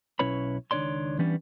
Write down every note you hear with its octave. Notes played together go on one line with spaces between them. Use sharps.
B1 C#4 E4 B4 C#5 B5
C#2 D#3 D4 C#5 D5 C6
E3 G3 B3 C#4 D4